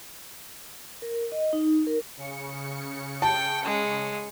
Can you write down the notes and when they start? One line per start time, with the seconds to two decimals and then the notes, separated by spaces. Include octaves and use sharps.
1.02 A#4
1.32 D#5
1.53 D#4
1.87 A#4
2.17 C#3 C#7
3.22 G5 A5
3.65 G#3